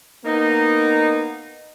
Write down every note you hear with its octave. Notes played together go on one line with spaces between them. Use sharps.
A#3 B3 D#4